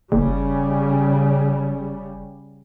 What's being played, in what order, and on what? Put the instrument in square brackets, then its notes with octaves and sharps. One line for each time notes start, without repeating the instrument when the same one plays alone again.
[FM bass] F#1 [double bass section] C#3 G3